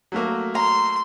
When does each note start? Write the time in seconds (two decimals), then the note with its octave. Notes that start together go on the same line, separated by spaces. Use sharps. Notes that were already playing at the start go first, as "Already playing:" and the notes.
0.12 F#3 A3 A#3
0.55 A#5 C6